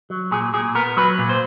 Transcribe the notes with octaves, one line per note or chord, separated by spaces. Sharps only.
F#3
A#2 G#4
A#2 G#4
B3 A#4
F#3 B4
A#2
C5